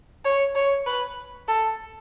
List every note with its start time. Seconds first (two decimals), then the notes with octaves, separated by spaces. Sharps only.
0.25 C#5
0.55 C#5
0.86 B4
1.48 A4